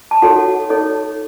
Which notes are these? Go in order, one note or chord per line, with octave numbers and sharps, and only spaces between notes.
A5
D#4 F#4 A4 C#5 F#5
D#4 A4 C#5